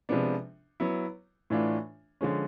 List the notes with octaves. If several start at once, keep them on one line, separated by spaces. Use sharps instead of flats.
C3 F3 G#3 B3 D4
F#3 B3 E4
A2 E3 A3 D4 F4
D3 F3 G#3 C#4